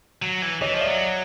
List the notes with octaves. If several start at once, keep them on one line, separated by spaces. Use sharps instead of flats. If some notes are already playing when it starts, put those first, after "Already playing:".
F#3
E3
E3 C#5 D#5
F3
D5 E5
F#3